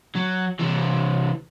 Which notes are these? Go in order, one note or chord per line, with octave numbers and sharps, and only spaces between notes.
F#3
C3 E3